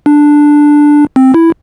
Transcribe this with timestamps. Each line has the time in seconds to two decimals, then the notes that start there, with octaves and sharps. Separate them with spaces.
0.06 D4
1.16 C4
1.34 E4